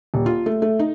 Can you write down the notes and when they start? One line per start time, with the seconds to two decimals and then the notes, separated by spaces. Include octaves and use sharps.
0.14 D#1
0.26 F4
0.46 A3
0.62 A3
0.79 D#4